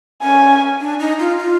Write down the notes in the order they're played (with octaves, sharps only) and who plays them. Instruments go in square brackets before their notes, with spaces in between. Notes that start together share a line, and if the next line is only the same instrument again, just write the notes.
[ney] C#4 [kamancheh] G#5
[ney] D4
D#4
F4
F4